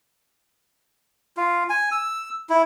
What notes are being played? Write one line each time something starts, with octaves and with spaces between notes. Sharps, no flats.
F4
G#5
E6
E4